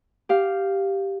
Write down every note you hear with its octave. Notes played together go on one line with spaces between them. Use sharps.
G4 F5